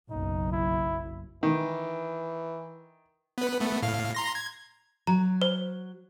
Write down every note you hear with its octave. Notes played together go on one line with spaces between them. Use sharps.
F#1 B1 D#4
E4
D#3 E3
B3 B4
A3 B3
A2 F5
A#5 C6 A#6
G#6
F#3 A#5
C5